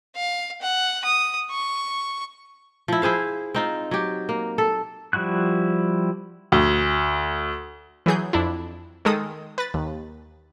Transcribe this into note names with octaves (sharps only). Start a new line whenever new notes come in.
F5
F#5
D#6
C#6
F3 E4
E4 G#4 C5 F5
C4 D#4 F4
F#3 G4
A#3
A4
F3 G3 E4 F#4 F#6
D2
E3 F#3 G#4 G6
F2 D4 E4
D#3 G#3 A4 D#6
B4 A6
D#2